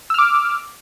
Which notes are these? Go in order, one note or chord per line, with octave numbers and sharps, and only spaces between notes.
D6 E6 F6